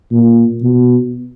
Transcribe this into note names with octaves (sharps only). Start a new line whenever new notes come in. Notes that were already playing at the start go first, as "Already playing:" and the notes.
A#2
B2